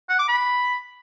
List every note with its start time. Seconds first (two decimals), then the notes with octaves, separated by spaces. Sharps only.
0.09 F#5
0.19 D6
0.28 B5